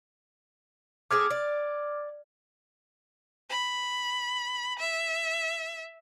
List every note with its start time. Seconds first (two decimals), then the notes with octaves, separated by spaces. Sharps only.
1.11 A3 C4 G#4 D6 F6 G#6
1.30 D5
3.50 B5
4.79 E5